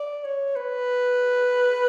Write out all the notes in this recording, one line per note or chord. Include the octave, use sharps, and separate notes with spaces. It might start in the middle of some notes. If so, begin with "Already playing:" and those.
Already playing: D5
C#5
B4